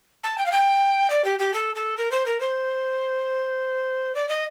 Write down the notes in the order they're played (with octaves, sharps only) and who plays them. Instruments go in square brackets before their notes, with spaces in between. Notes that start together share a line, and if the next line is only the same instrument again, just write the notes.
[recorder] A5
G5
F5
G5
D5
G4
G4
A4
A4
A#4
C5
A#4
C5
D5
D#5